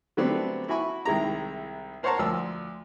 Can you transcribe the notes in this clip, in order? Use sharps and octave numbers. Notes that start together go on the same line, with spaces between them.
D3 F#3 G3 A3 B3 C4
E4 F#4 G#5 B5 C#6
C2 D#3 G#3 E4 A#5
A#4 C5 C#5 F#5 A5 A#5
D2 F3 E6